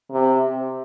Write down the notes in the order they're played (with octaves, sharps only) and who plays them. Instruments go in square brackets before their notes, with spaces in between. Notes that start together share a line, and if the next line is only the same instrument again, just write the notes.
[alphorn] C3